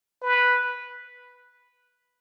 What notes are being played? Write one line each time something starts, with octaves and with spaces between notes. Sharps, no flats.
B4